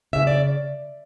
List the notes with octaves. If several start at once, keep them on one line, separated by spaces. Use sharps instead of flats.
C#3 E5
D5